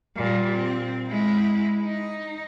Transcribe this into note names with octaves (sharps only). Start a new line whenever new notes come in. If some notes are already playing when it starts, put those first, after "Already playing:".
A#2 G3
C4
G#3 E4
D#4